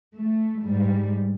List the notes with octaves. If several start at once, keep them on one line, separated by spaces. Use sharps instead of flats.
A3
G#2 G3